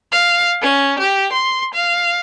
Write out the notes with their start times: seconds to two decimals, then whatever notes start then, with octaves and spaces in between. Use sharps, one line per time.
0.12 F5
0.62 C#4
0.99 G4
1.32 C6
1.74 F5